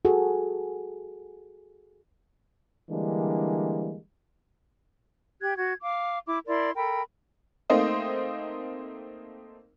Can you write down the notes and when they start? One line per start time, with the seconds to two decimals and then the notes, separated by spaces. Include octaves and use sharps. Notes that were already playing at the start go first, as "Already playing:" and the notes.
0.05 F#4 G#4 A4
2.90 D3 E3 G3 G#3 A#3 D4
5.42 G4 F#6 G#6
5.56 F#4 G#6
5.83 F5 D6
6.27 E4 D6
6.47 E4 A#4 D5 C6
6.75 A4 A#4 G5 B5
7.70 A3 A#3 C4 D#4 C5 D#5